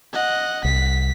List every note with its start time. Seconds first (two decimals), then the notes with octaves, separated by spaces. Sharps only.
0.13 D#5 F#5
0.65 C2 B6